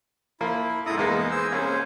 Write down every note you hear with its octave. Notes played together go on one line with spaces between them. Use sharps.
F3 A#3 E4
G#2 E4 A4 A#5 D#6
E2 G#3 A#3 B3 D#4
G#4 C5 E6
C2 A#3 C#4 G#4 C5